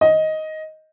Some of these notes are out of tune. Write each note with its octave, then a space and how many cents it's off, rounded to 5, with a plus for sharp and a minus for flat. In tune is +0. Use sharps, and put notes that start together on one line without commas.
D#5 +10